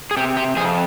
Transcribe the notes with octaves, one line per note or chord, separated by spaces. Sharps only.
G#4
C3 G4
G4
F2 G#4